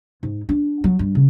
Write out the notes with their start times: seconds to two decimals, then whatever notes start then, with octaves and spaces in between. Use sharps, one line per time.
0.23 G#2
0.49 D4
0.84 F#3
0.99 G2
1.15 C#3